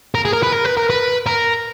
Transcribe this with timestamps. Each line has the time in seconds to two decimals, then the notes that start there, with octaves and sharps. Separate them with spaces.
0.15 A#4
0.25 G#4
0.33 A#4
0.43 B4
0.52 A#4
0.64 B4
0.77 A#4
0.90 B4
1.27 A#4